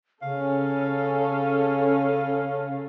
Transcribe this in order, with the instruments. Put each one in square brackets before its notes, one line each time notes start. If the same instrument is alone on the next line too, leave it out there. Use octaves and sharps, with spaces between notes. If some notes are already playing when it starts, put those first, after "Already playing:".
[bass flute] C#3 [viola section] C#4 A4 [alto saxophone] F5